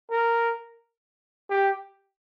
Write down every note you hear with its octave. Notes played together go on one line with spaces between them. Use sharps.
A#4
G4